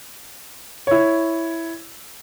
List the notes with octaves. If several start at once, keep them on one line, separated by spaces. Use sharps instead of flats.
E4 C#5